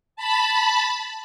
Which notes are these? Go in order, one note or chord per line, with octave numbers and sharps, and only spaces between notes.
A5 B5